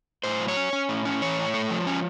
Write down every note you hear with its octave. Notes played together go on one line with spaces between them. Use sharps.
A2 C5
F#3
C#5
C#4
C#4
A2
C#4
E3 C#5
A2
A3
F3
C#4